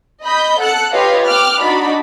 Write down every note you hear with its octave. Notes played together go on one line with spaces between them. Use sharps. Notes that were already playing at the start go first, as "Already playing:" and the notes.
D#5 B5 G6
A4 F#5 F#6 C#7
F4 G4 B4 C#5 D#5 F5
G5 D6 F6 F#6
D4 D#4 F#4 D5 B5